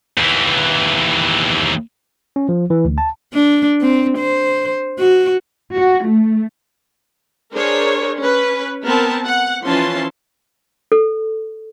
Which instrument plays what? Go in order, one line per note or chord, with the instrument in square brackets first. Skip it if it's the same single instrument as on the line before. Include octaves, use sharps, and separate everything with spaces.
[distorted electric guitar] D#2 E3
[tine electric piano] C#4
F3
E3
D2
A5
[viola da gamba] D4
C4
C5
F#4
[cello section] F#4
A3
[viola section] D4 G#4 A#4 C5 C#5
C#4 B4
B3 C4 A#4 A5
F#5
E3 F3 C#4 A5 C6
[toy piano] A4